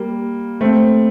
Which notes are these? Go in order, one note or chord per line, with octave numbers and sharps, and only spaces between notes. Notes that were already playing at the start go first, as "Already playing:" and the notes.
Already playing: G3 A#3
A3 C4